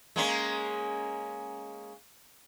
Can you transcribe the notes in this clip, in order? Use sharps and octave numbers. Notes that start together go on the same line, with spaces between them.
G#3 A#3 C#4